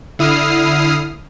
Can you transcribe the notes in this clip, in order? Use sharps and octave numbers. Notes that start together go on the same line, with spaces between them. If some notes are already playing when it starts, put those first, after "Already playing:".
D3 E4 D#6 F6 C7